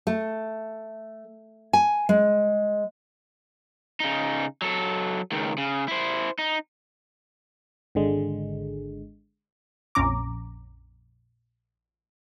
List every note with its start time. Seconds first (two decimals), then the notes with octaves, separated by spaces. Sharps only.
0.07 A3
1.73 G#5
2.09 G#3
4.00 C#3 D#4
4.62 F#3 A4
5.32 C#2 D#3
5.58 C#3
5.88 E4 C5
6.39 D#4
7.95 G#1 D3 G#3
9.95 A#1 F2 C#4 A#5 D6